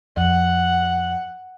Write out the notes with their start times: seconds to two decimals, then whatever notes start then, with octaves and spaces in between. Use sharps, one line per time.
0.17 F2 F#5